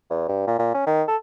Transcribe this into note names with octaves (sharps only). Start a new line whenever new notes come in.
E2
G2
A#2
A#2
C#4
D#3
A4